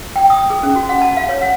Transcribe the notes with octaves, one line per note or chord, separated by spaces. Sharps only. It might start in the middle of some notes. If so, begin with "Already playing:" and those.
G5
D#6
G#4
C#4
F#4
F#5
A5
F5
C#5
F#5